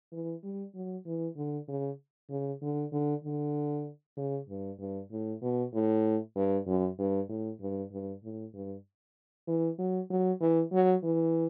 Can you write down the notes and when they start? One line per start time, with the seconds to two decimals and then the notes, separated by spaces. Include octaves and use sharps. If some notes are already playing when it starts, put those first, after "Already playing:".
0.12 E3
0.44 G3
0.75 F#3
1.06 E3
1.36 D3
1.68 C#3
2.30 C#3
2.62 D3
2.92 D3
3.24 D3
4.17 C#3
4.49 G2
4.79 G2
5.11 A2
5.41 B2
5.73 A2
6.36 G2
6.67 F#2
6.98 G2
7.28 A2
7.61 G2
7.92 G2
8.23 A2
8.54 G2
9.47 E3
9.78 F#3
10.10 F#3
10.40 E3
10.72 F#3
11.03 E3